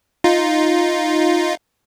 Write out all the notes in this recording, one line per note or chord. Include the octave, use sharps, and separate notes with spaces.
D#4 F4